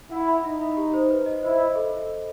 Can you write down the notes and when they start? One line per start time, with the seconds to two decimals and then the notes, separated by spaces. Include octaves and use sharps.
0.11 E4 F#5
0.28 B5
0.44 D#4 E5
0.61 B5
0.77 G4
0.94 C5
1.10 B4
1.26 D#5
1.43 E4 C5
1.59 D#5
1.75 A4